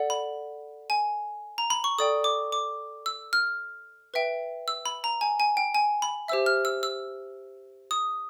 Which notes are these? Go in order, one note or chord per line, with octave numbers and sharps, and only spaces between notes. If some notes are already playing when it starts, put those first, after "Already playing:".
Already playing: A4 D5 F#5
B5
G#5
A#5
B5
C#6
A4 D5 G5 D#6
D6
D6
E6
F6
B4 E5 G5
E6
B5
A#5
G#5
G#5
G5
G#5
B5
G4 C5 E5 E6
F6
E6
E6
D#6